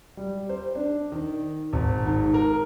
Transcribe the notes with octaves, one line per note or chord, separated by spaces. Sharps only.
G3
C5
D4
D#3
G#1
G#2
A#4